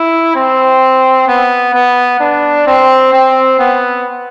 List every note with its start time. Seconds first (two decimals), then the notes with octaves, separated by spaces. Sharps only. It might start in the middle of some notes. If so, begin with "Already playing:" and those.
Already playing: E4
0.35 C4
1.28 B3
1.74 B3
2.20 D4
2.67 C4
3.13 C4
3.59 B3